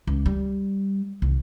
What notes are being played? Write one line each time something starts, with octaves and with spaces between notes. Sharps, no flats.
C#2
G3
C2